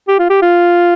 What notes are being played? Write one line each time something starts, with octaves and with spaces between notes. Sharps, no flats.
G4
F4
G4
F4